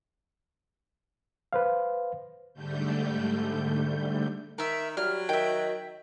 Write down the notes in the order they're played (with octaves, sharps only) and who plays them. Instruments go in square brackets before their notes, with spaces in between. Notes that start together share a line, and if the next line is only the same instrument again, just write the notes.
[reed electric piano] B4 C5 F5
[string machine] G#2 D3 G3 A3 G6
[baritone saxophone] D#3 [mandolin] A#4 E5
[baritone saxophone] F#3 [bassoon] G3 [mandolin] F6
[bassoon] D#3 [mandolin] E5 G5